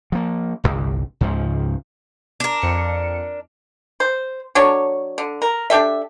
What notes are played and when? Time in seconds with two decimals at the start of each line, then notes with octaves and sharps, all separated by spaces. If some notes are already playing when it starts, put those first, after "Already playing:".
0.12 F3 A#3
0.64 D1 G1 C2
1.21 C#2 G#2 C#3 F3
2.40 D4 A#4
2.62 F2 C#7
4.00 C5
4.55 F#3 D4 A4 C#5
5.18 D3
5.42 A#4
5.70 D4 G4 A4 E5